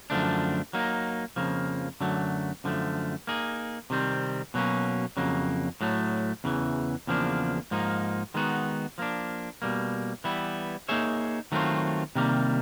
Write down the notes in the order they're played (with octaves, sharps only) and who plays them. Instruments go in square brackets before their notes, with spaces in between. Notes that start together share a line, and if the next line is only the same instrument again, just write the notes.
[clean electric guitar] F#2 D3 F3 A3 D4
F#3 A#3 D#4
F2 C#3 F3 A#3
F#2 D3 F#3 A3
F#2 D3 F3 A3
A#3 D#4 G#4
C3 D#3 G3 C4
B2 F#3 A#3 C#4
F2 C#3 F#3 A#3
A2 F#3 A3
E2 C#3 E3
E2 C#3 F3 A#3 D4
G#2 F3 A#3 D#4
D#3 G#3 B3 D#4 F#4
F3 A#3 D4
B2 G3 A#3
E3 G3 B3 E4
A#3 D#4 G#4 C#5 E5
D#3 F#3 A3 C4 F4
C3 D#3 G3 A#3